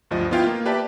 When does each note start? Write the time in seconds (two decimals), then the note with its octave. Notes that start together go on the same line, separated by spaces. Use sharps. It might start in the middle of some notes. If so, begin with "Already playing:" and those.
0.11 D2 G2 F3 D#5
0.31 B3 E4 F4 F5 G5
0.47 A#3
0.66 G4 B4 D5 E5 A5